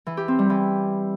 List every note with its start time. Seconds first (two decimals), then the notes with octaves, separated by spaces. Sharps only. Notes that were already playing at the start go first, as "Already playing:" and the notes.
0.06 E3
0.17 G4
0.28 C4
0.39 G3
0.50 E3